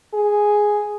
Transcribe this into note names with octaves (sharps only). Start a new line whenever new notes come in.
G#4